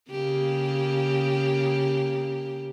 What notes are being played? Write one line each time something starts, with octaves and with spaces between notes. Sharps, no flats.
C#3 A#3 G4